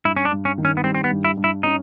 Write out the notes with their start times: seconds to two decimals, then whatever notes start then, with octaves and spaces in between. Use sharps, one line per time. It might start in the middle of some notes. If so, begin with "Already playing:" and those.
0.05 G2 E4
0.16 C#4
0.25 D4
0.31 G2
0.45 C#4
0.58 D#3
0.65 C#4
0.77 B3
0.84 G3 C4
0.95 C4
1.04 B3
1.11 G2
1.25 E4
1.37 G2
1.44 E4
1.63 C#4 D#4